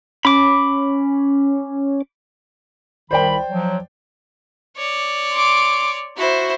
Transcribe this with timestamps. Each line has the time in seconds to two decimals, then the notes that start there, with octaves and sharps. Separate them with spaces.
0.25 C#4 B5 D6
3.11 C2 D#3 C5 D5 G5 B5
3.50 F3 F#3
4.77 C#5 D5
5.32 C6 D6
6.17 E4 F#4 C5